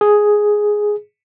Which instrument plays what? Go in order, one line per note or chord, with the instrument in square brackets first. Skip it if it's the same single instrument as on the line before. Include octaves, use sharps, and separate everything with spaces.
[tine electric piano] G#4